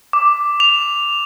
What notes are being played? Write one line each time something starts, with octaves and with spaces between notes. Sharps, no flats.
D6
F7